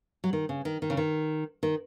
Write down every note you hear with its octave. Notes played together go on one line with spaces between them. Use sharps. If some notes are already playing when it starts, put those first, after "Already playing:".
F#3
D#3
C#3
D#3
D#3
C#3
D#3
D#3